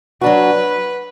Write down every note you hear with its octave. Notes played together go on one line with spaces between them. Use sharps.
F#3 D4 F#4 B4